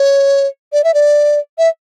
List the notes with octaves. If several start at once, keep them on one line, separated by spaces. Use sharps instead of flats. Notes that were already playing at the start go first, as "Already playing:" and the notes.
Already playing: C#5
D5
E5
D5
E5